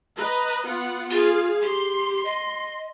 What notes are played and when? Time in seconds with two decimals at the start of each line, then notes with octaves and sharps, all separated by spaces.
0.17 B4 D#5 A#5
0.66 B3 F4 F#5
1.11 F4 G#4 F5
1.62 G4 C6
2.25 D#5